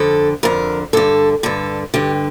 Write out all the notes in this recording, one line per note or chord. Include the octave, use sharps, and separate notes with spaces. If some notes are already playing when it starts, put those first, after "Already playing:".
Already playing: F2 D3 A4
F2 D3 A#4
G2 D3 A4
G2 D3 A4
G2 D3 G4